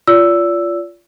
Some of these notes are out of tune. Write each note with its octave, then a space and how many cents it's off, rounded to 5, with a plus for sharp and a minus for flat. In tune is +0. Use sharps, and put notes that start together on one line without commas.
F4 -10 D5 -35 E6 +0